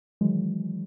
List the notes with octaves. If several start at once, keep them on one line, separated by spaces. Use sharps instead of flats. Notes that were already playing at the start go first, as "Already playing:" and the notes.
D#3 E3 F#3 G#3